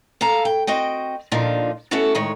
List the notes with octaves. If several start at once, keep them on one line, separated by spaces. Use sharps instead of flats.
A4 F5 G#5 A#5
G5
C4 F#4 D#5 G5
A#2 D3 F3 D4 D#4 F4
A3 B3 C#4 E4 F#4 A4
D2 A2 D#3 G#3 C#5